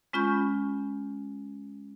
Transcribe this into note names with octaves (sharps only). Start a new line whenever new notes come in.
G#3 C#4 F4 B5 C#6 G6